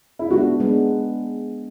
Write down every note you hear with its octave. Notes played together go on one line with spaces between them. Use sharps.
E4
G#3 B3 D4 F#4
G#3 B3 D4